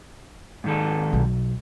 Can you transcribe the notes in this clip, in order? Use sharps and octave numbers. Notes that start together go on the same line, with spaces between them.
G#2 D#3 A4
B1